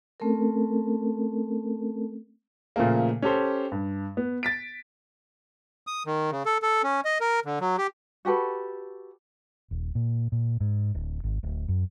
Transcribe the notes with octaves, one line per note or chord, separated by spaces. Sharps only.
A3 C4 C#4 A4 A#4
A#2 C#3 F3 A3 A#3
C#4 G4 A4 C5
G2
B3
A6 B6 D7
D#6
D#3
C#3
A4
A4
C#4
D#5
A#4
D3
F#3
G4
F#4 G4 A4 B4
D#1
A#2
A#2
G#2
D1
G#1
D1
F#2